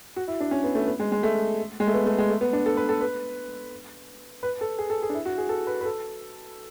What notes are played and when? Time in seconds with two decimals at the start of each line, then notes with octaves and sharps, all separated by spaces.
0.16 F#4
0.28 E4
0.40 D4
0.51 C#4
0.64 B3
0.75 A3
0.87 B3
0.99 G#3
1.12 G#3
1.23 A3
1.80 G#3
1.87 A3
1.94 B3
2.06 A3
2.18 G#3
2.29 A3
2.41 B3
2.53 D4
2.66 A4
2.77 B4
2.89 A4
3.00 B4
4.43 B4
4.61 A4
4.78 G#4
4.90 A4
5.02 G#4
5.09 D4
5.14 E4
5.25 F#4
5.38 G#4
5.49 A4
5.67 B4
5.81 B4
5.85 A4